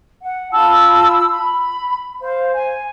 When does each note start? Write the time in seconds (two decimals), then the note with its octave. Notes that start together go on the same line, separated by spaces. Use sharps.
0.21 F#5
0.52 F4 A5 B5 E6
1.29 B5
2.21 C5 F5
2.53 G#5